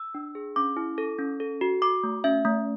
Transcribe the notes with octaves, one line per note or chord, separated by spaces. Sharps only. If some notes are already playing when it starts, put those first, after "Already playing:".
Already playing: E6
D4
G#4
C#4 D6
E4
A4
C#4
A4
F#4
F#4 D6
A3
C#4 E5
A3